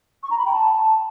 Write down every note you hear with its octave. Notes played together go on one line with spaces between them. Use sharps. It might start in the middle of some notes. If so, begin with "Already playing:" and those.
C#6
A#5
B5
G5
A5